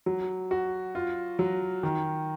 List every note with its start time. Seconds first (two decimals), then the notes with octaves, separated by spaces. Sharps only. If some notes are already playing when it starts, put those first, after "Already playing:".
0.06 F#3
0.51 F#4
0.95 F4
1.39 F#3
1.83 D#3